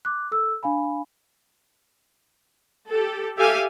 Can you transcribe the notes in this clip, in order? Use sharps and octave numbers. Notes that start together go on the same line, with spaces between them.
D6 F#6
A4 E6
D4 F5 G#5 B5
G4 A4
G4 A4 E5 F5 G#5